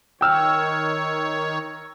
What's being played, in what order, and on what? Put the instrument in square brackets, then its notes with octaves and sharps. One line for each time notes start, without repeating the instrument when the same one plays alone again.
[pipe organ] D#3 C#5 [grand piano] G5 E6 F6